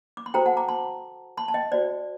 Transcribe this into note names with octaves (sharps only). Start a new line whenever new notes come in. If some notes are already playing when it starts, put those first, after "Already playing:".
D6
C6
F#4 A4 C5 G5 A#5
F#5 A5
A#5 D6
A5 C6
A5 C6
A5
D#5 G5
F#4 C5 D5